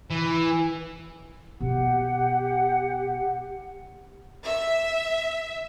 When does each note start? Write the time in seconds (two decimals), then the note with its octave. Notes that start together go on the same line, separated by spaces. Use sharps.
0.10 E3
1.61 B2 G4 F#5
4.45 E5